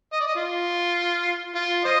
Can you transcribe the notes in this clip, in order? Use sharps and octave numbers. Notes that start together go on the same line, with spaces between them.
D#5
D5
D#5
F4
F4
C5 D#5